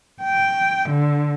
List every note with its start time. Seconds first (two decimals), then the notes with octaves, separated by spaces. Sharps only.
0.23 G5
0.89 D3